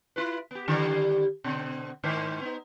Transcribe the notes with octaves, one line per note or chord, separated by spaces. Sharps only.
E4 F4 B4
B3 G4
D3 D#3 G3
B2 D3 C4
G#2 D#3 C5
B3 D#4